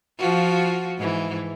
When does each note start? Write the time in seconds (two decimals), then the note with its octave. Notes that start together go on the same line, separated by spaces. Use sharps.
0.18 F3 F4 F#4
0.98 G#2 E3